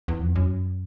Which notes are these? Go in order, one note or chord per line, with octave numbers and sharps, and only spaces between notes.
E2
F2
F#2